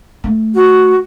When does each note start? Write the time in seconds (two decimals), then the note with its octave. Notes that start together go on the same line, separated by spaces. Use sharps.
0.24 A3
0.54 F#4